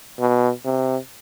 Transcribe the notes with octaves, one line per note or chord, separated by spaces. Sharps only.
B2
C3